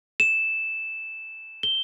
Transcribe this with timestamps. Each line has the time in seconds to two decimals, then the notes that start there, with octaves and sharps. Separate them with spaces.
0.20 E7
1.63 G7